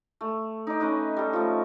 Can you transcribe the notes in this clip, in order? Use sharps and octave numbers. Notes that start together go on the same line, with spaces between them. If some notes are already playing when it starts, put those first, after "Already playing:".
A3
D#4 D6
C#4 D#4 B4 D#5
G3 A4
F3 A3